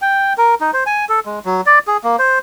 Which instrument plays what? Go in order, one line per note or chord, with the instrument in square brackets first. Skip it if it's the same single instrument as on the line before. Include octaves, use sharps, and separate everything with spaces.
[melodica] G5
A#4
D#4
C5
G#5
A4
G#3
F#3
D5
G#4
A#3
C5